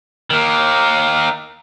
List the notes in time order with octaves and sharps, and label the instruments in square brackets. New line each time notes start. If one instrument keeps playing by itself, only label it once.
[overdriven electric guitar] D#3 A#3